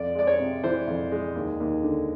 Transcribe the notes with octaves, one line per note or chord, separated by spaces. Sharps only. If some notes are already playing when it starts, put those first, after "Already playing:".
Already playing: F2 D5
G#3 D5
C#5
C3
E3 C5
F2
G#3
D#2
D#2
D3